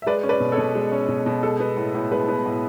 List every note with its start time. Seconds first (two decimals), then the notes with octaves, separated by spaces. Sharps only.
0.02 E5
0.06 G#3 B4 D5
0.23 C#4
0.29 B4 D5
0.40 B2
0.52 A4 C#5
0.58 B2
0.75 G#3
0.92 C#4
1.08 B2
1.26 B2
1.43 G#3 A4
1.60 B3
1.77 A2
1.95 A2
2.12 G#3 B4
2.28 B3
2.46 A2